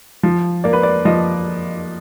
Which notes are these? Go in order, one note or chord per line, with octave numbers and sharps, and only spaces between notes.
F3
A#3 D5
B4
D5
F3 D#5